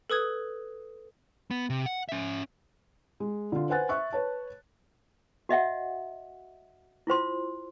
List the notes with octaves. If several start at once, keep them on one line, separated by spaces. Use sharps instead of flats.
A4 B4 D#6 G#6
B3
C3
F#5
C#4 E5
G#3
D3 F4
B4 C5 F#5 G#5 F#6 A6
E5 C#6 F#6
B4 C#5 A5
F#4 D#5 E5 F#5
E4 F4 C5 C6